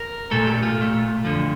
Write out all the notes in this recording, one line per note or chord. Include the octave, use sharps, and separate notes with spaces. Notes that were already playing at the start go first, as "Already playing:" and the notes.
Already playing: A#4
A#2 A3 A4
G4
F4
A#2 A3
F2 D3 F3